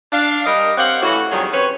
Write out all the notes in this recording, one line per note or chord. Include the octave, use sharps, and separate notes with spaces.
D4 F5
G3 A#4 D#5
C4 G4 C#5 F5 F#5
E3 A3 C#4 E4 F#4
F2 D#3 F#3 G3 G#4 C#5
C4 C#4 B4 C#5